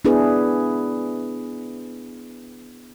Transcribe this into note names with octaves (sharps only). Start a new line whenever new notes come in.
B3 D4 E4 G#4 B4